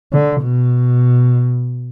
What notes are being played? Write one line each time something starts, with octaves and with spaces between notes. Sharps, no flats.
D3
B2